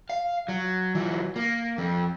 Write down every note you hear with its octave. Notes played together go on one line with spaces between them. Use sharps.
F5
F#3
E3 F#3
A#3
F2